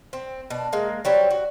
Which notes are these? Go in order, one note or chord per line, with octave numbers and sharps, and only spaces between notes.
C4
B2 D4
G#3 A#3
F#3 G3 C4 C#5
F#4